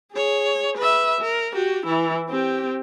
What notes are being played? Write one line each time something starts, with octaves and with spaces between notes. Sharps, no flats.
G#4 C#5
B4 E5
A#4
F#4 G4
E3 E4
C4 G4